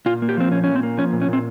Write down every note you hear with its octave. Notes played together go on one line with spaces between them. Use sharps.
A#2 F4
A#3
G4
F3 C4
A#2 C#4
A#2 C#4
C4
A#3
F3 C#4
A#2
C#4
A#2 C4